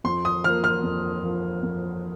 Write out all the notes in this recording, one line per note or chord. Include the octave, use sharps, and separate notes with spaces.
F2 C6
D#6
F3 A#3 F6
F6
F2
F3 A#3
F2